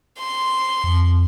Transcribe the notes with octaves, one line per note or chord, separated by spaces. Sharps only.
C6
F2